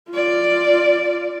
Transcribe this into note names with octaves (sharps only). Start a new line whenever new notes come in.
F4 D5